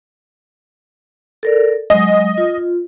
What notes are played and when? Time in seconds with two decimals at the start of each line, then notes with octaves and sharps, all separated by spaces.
1.43 A4 A#4 D5
1.90 F#3 G#3 D#5
2.38 F4